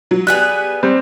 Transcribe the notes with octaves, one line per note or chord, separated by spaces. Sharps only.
F#3
G3 B3 G#4 F#6
G3 C4